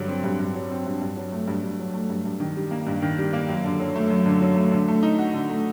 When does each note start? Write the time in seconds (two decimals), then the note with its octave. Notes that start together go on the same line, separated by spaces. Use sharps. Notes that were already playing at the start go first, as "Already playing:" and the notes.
Already playing: G2 D3 F#3
0.08 C4
0.24 G2
0.40 G2
0.55 F#3
0.71 C4
0.86 G2
1.02 G2
1.17 F#3
1.32 A3
1.48 G2
1.63 G2
1.79 F#3
1.94 A3
2.10 G2
2.26 G2
2.40 D#3
2.56 G3
2.71 A#3
2.87 G2
3.02 D#3
3.18 G3
3.33 A#3
3.49 F#2
3.64 D3
3.80 F#3
3.96 A3
4.10 F#2
4.26 D3
4.42 F#3
4.56 A3
4.72 D3
4.88 A3
5.03 D#4
5.19 F#4
5.33 D3
5.50 A3